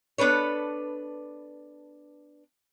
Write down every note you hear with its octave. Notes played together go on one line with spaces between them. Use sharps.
B3 D4 A4 B4 C#5